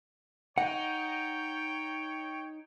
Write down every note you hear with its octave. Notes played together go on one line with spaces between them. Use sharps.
D#4 C#5 F#5 G5